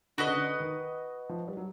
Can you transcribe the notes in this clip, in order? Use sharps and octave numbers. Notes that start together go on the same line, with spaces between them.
D3 F#4 B4 D#5
C#3
D3
D#3
F3
G3
F#3